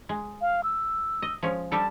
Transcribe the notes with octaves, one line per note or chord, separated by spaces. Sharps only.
G#3
F5
E6
D#5
F3 G#3 C#4
G3 G4 A4 A5